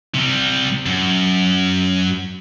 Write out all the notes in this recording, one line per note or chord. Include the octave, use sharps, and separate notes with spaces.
C3 G3
F#2